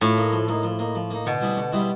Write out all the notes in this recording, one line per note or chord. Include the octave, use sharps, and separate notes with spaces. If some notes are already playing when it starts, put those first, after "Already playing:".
A2 F3
A#3 D#4
F3
A#3 D#4
F3
A#3 D#4
F3
A#3 D#4
B2 D3
G3 C4 E4 G#4
D3
G3 C4 E4 G#4